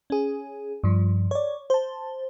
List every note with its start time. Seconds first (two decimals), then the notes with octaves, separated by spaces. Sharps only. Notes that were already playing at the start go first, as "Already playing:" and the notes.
0.10 C#4 G#4
0.84 G2 F3
1.31 C#5 D5
1.70 C5 A5